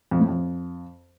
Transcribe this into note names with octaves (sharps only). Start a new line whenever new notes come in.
F2
A2
F2